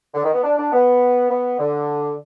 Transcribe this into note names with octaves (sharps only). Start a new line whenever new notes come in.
D3
D#3
B3
D4
D4
B3
B3
D3